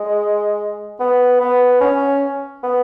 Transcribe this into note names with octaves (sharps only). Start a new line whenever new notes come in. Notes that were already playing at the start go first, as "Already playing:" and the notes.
Already playing: G#3
B3
B3
C#4
B3